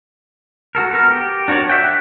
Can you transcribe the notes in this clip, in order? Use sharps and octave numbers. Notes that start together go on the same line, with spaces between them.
F#4 A4 A#4
B3 A#4
G4
D4 F#4 A#4 C#5 D5
D5 E5 F#5 G5